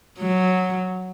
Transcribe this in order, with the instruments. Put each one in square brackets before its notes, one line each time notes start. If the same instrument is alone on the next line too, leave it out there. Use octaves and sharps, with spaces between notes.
[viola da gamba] F#3